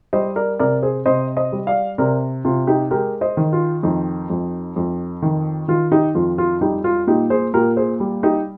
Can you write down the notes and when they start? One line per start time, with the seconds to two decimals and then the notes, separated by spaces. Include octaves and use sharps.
0.13 G3 C5 D#5
0.36 A#4 D5
0.60 C3 A#4 D5
0.83 G#4 C5
1.06 C3 C5 D#5
1.36 C5 D#5
1.52 G3
1.67 D5 F5
1.98 C3 A#4 D5
2.45 C3 F4
2.67 D#4 G4
2.91 G#3 G4 A#4
3.21 C5 D#5
3.37 D#3
3.53 F4
3.83 F2 D#4
4.30 F2
4.76 F2
5.22 D#3
5.68 D#3 F4
5.92 D#4 G4
6.15 F2 F4
6.38 F4
6.61 G3 D#4 G4
6.84 F4
7.07 A#2 D#4 G4
7.30 G#4 C5
7.54 A#2 G4 A#4
7.77 G#4 C5
8.00 G3
8.23 D#4 G4